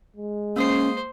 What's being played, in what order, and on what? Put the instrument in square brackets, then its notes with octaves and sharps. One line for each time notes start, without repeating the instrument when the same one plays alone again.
[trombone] G#3
[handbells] A#3 D#6 C7 [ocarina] C#4 [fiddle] C5